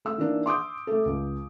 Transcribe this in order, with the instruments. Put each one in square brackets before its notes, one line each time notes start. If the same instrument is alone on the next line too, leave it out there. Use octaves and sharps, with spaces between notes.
[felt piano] A3 E6
E3 A#3 D4 D#4
C6 D6 D#6 G6
A3 A4
C#2